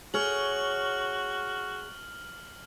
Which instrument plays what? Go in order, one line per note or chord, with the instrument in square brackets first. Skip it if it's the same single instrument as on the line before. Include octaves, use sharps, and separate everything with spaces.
[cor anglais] F#4 [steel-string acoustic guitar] G#4 C#5 [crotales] F6 F#7